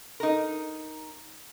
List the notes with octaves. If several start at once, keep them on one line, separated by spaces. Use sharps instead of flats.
D#4 A#4